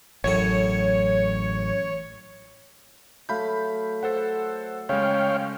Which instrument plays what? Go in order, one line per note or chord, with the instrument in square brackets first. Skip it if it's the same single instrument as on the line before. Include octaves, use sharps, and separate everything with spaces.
[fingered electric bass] A1 [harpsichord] F#2 A2 A4 [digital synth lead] C#5
[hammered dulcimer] F#3 A3 [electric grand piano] F5 B5 G6
[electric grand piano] A4 C5 F#5
[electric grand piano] C#3 G#3 [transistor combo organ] C#5 F5 G5